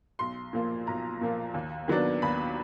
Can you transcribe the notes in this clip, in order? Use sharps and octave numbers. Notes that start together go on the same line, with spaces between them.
B1 C6
A#2 F3 A#3
B1 A#5
A#2 F3 A#3
D#2
D#3 F#3 B3 D4
D#2 B5